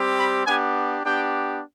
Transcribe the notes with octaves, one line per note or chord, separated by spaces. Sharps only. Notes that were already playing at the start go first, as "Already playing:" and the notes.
Already playing: G3 C4 G4
B5
B3 D4 G4 G#5
B3 D4 G4 G5